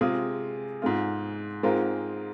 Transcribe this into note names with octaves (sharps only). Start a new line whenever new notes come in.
C3 G#3 F4 G#4
G#2 G#3 F4
G#2 G#3 C4 F4 A#4